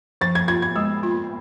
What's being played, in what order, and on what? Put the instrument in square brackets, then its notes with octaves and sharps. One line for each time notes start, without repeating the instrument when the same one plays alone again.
[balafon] F3 [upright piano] A6
[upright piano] G#6
[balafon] F4 [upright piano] G#6
[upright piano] G#6
[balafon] G#3 [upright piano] E6
[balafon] F4